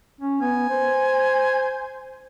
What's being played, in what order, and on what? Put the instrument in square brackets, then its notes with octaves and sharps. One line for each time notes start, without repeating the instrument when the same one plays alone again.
[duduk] C#4
[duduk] B3 [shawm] G#5
[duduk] C5